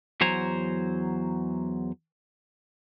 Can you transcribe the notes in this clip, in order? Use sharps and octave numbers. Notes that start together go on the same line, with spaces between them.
E2 F#3 C5 G#5 A#5